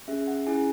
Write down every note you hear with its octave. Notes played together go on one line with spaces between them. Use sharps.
C#4 G#4 E5
F#5
C#4 E4 G#4 G#5